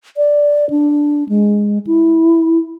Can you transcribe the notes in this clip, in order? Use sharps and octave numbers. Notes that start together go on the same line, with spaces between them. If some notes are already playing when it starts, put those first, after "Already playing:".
D5
D4
G#3
E4